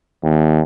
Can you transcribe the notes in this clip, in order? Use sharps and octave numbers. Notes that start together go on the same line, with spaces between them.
D#2